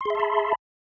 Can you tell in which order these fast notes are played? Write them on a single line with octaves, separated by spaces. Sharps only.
C6 G#4 E5 A5 B5